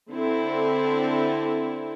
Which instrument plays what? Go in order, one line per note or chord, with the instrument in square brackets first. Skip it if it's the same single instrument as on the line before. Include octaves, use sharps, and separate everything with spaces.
[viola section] D3 C4 E4 A4